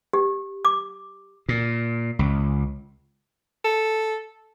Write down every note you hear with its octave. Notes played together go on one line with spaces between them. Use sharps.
G4
D6
A#2
C#2
A4